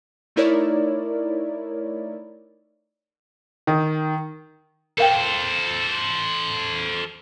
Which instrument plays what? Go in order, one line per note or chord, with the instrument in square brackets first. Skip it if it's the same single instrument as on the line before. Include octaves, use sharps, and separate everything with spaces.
[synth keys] A3 D#4 E4 A#4 C#5 D5
[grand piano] D#3
[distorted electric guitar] A4 C5 [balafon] A#4 F5 G5